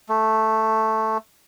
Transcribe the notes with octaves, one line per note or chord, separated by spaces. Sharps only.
A3